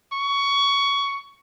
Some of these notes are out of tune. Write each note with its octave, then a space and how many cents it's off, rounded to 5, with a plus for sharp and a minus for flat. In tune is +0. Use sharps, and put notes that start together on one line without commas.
C#6 +15